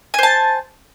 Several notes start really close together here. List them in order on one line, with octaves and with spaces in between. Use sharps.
G#5 C5 A5